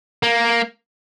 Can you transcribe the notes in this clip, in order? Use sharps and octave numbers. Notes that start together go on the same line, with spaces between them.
A#3